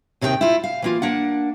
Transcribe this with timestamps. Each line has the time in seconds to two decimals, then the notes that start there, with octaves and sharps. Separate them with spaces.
0.21 D#2 C3 D#3 B4 G5
0.41 E4 F4
0.63 F5
0.82 E3 A#3 F4
1.02 A#3 D4 F#5